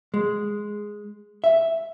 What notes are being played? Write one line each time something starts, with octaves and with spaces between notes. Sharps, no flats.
G#3
E5